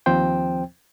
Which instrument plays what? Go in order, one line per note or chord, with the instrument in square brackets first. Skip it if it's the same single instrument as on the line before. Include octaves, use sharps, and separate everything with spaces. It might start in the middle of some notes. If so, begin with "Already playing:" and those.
[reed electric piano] D#2 F3 C4 C5 G5